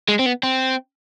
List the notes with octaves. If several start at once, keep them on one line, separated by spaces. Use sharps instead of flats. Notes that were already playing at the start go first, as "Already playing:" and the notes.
G#3
C4
B3
C4